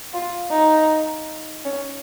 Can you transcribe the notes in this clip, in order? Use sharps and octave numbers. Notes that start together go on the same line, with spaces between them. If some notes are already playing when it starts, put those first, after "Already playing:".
F4
D#4
C#4